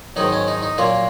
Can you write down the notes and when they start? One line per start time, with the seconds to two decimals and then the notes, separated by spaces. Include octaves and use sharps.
0.16 G#2 D#3 F#3 D#4
0.32 C#4
0.48 D#4
0.63 D#4
0.78 A#2 F#3 A#3 F4